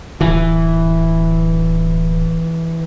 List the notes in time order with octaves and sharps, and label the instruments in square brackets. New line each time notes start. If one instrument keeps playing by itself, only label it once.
[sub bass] D1 [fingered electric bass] E3